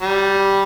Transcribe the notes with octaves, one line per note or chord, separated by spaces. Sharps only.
G3